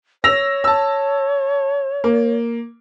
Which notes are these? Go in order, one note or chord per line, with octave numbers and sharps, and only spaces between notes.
C#5 E6 A#6 F7
A5 E6
A#3